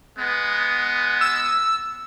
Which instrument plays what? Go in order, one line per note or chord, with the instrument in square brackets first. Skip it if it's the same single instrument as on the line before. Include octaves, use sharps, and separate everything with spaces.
[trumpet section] G#3 B3
[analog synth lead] E6